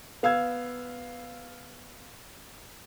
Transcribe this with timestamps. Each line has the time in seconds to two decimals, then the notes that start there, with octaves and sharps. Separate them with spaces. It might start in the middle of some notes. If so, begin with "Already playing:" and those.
0.23 B3 F5 E6 G#6